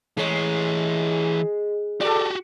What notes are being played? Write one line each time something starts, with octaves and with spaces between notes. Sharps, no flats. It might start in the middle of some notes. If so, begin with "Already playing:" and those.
E3 G#3 C#5
F#4 G4 A4 D5